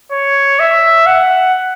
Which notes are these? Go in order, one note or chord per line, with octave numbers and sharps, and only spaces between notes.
C#5
E5
F#5